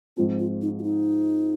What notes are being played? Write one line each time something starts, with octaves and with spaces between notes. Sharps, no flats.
G#2 F3 G#3 C4 F4
F4
D#4
F4
D#4